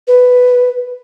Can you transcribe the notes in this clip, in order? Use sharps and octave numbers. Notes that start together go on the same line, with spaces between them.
B4